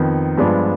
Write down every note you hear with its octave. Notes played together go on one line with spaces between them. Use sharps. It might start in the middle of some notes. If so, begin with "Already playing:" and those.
Already playing: F2 D#3 B3
G2 F3 G#3 B3 D4